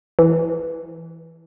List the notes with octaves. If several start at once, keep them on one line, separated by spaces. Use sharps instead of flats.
E3